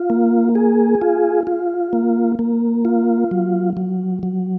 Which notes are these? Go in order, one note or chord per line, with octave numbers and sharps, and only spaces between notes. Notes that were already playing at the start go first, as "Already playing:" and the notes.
Already playing: F4
A#3
G#4
F4
F4
A#3
A#3
F4
F#3
F#3
F#3